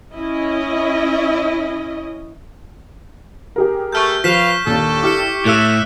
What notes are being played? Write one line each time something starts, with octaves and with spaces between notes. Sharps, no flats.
C#4 E4 D#5
G4 G#4 A#4
A3 C#6 F6 G6
F3 B4 F5 B6 E7
D#2 A#2 D4 A4
E4 G4 D6 F6 C#7
A2 A4 E5 E6 F#6 E7